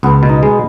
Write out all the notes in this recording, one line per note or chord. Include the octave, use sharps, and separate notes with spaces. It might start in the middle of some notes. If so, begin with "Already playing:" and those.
C#2 B3
B2
D#4
G#3